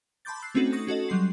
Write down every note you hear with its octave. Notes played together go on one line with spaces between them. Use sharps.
A5 B5 C6 D6 G6 A6
E6 F#6 C7
A3 C4 C#4 D#4 F#4 A4
C#6 D#6 A#6
C#4 F#4 A4 D#5
F#3 G3 C6 C7